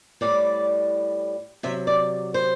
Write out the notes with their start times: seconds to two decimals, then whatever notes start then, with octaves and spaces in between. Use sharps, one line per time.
0.21 A2 G3 D5
1.63 C3 F#3 E5
1.87 D5
2.34 C5